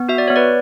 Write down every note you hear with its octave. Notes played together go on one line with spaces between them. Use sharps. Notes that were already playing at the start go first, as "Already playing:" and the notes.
Already playing: B3
F#4 E5
D5
B3 C#5
B4 D5